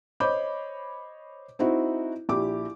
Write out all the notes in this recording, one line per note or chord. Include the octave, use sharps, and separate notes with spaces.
C5 C#5 D#5 B5 D6 G6
C4 D#4 E4 F#4
A#1 E4 G4 D6